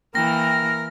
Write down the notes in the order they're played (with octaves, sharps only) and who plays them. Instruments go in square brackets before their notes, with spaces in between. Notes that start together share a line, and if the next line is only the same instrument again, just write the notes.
[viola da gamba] E3 A#3 [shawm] A#4 [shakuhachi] G5 [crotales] A#6